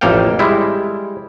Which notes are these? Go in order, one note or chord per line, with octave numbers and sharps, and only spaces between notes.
A1 F2 A#3 A4 F5 G5
G3 G#3 E4